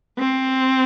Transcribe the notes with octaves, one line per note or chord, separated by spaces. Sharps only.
C4